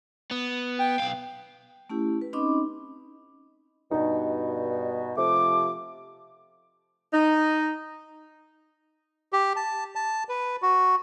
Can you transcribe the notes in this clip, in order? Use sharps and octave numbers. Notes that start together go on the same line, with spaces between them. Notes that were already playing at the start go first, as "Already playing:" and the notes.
B3
G5
B1 F5
A3 C#4 E4 G4
B4
C4 C#4 D#4 D#5 B5 D6
G2 B2 D#4
C3 F3 A3 D6
D#4
G4
A5
A5
B4
F#4